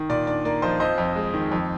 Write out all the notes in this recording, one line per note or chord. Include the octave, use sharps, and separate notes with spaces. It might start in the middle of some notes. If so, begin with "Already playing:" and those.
Already playing: D#3
A#2 D5
D4 D5
A#3 D5
F3 C5 D#5
F2 C5 D#5
F2
G#3
D#3
F2